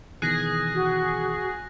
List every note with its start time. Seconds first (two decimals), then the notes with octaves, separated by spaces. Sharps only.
0.22 B2 D#3 E3 G#4 F#6 A#6
0.74 F#4